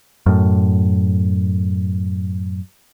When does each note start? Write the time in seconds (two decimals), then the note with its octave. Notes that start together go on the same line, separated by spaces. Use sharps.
0.26 F#2 A2